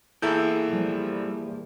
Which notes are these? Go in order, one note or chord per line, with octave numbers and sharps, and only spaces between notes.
E2 E3 A#3 E4 G#4 A4 E5 G6
F3 G3